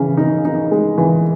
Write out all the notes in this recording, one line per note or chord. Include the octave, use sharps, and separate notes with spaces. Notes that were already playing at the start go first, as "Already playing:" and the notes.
Already playing: C#3 E3
D#4
D#4
G#3
E3